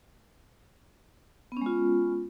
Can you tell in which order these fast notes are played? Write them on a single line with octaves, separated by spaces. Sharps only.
B3 C#4 G#3 F4